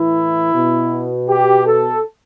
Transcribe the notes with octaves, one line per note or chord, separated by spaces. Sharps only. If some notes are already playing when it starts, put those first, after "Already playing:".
Already playing: A2 E3 E4
B2
G4
A4